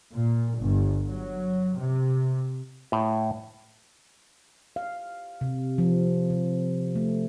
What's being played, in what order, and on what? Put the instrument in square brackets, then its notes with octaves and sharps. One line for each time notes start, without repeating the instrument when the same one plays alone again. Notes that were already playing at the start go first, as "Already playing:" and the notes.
[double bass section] A#2
G1
F#3
C3
[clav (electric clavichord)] A2
[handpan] F5
C3
F3
C3
A3